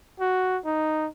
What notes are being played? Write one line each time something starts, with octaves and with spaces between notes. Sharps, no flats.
F#4
D#4